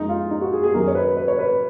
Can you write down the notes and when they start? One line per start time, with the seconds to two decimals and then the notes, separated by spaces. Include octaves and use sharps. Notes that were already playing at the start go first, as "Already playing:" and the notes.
Already playing: F#2 F3 G#3 D#4
0.09 F4
0.31 D#4
0.41 F#4
0.53 G#4
0.63 G#4
0.74 F#2 D#3 F#3 A#4
0.88 C#5
0.95 B4
1.17 B4
1.28 C#5
1.39 B4